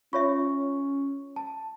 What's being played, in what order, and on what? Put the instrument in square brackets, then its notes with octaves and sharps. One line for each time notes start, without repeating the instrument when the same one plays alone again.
[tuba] C#4 [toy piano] F4 C#5 E5 [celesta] C#6
[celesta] A5